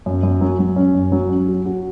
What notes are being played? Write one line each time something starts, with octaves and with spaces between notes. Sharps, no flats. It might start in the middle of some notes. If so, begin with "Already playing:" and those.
F#2
F#2
F#3
F#3
C#4
F#2
F#3
C#4
F#4
F#4